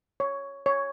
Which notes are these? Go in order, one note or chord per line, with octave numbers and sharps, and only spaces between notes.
C#5
C#5